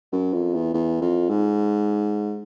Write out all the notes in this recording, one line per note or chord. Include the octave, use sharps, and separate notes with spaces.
F#2
F2
E2
E2
F2
G#2